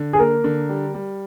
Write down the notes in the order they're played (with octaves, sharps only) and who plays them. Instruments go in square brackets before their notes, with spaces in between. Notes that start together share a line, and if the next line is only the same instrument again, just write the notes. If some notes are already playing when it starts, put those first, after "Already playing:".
Already playing: [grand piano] D3
[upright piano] G#4
[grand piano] A#3 [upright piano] A#4
[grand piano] D3
G3
G3